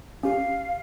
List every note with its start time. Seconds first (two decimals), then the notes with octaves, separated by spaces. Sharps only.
0.23 C#4 G4 F5